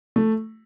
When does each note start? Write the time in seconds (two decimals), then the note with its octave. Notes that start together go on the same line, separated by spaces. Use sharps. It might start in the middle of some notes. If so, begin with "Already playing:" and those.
0.16 A3